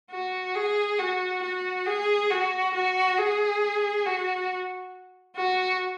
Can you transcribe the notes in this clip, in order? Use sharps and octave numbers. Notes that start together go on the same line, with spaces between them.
F#4
G#4
F#4
F#4
G#4
F#4
F#4
G#4
F#4
F#4